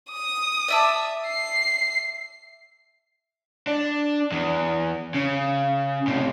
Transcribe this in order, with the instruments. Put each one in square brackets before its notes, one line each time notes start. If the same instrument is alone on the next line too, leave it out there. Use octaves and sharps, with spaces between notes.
[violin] D#6
[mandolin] D5 E5 A5
[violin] C7
[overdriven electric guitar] D4
E2
C#3
A2 C3